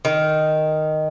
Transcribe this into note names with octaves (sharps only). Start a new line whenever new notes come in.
D#3